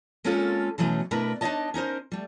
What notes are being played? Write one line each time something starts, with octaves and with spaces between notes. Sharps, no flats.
G#3 A#3 C4 C#4 F4 A4
B2 E3 F#3 A3 C#4
B2 A3 D4 E4 A#4 B4
D4 D#4 A#4 C#5 D#5 A5
C#4 D#4 A#4 C5
G3 A3